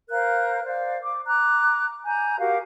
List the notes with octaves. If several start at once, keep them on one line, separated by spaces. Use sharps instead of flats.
A#4 C5 F5 F#6
C5 D5 F5
D6
A#5 D6 F#6
G#5 A#5 G6
F#4 G4 A#4 F5